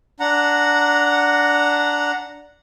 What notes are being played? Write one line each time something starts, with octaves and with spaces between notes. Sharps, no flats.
D4 F#5 A#5